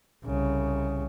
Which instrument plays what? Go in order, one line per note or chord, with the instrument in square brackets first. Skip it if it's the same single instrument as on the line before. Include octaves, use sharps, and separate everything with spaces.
[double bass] C2 C#3